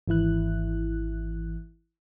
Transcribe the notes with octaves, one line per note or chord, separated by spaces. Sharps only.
G#1 E3 E4 F#6